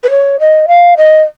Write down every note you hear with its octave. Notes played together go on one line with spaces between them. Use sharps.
B4
C#5
D#5
F5
D#5